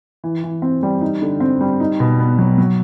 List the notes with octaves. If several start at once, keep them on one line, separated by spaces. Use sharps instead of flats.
E3
E3
C4
G3
D#4
D3
C4
G3
D#4
B2
B3
F#3
F#3